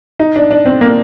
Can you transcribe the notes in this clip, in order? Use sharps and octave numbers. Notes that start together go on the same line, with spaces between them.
D#4
D4
D4
C4
A#3